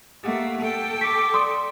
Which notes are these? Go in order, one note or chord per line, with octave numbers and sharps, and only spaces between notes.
A3 A#3 G4 F#5
A4 G5
C#6 D6 B6
D5 C6 D#6